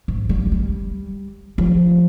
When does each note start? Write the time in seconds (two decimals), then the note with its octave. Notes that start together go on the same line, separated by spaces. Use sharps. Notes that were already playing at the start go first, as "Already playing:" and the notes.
0.08 G#2
0.29 G3
0.52 G3
1.58 F3